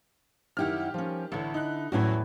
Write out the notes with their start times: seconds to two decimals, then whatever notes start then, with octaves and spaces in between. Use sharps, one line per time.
0.57 F#2 D#3 E4 G4 F#5 F6
0.94 F3 C#4
1.32 A1 D3 E4
1.54 D#4 F#6
1.92 E2 A2 F#3 C#4 E4 F#4